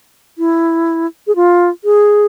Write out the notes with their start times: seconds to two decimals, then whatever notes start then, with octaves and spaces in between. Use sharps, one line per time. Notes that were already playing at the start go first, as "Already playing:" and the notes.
0.38 E4
1.27 G#4
1.36 F4
1.84 G#4